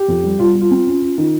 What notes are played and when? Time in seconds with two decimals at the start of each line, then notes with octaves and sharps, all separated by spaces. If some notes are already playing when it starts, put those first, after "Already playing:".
Already playing: G4
0.08 F2
0.23 G3
0.39 G3 F4
0.55 G3
0.61 F4
0.71 C4
0.87 C#4
1.02 C#4
1.18 D#3